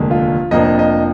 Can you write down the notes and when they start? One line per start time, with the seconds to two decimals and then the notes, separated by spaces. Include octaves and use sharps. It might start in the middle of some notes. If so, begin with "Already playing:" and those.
Already playing: F1 D#2 D3 G#3
0.11 F4
0.51 F1 F2 F3 A#3 D4 D#5
0.79 D#5